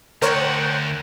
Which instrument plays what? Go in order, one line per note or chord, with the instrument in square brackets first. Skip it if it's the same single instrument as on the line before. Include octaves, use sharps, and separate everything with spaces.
[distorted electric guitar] D2 [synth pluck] A#4 C5 C#5 [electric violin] F#5 G5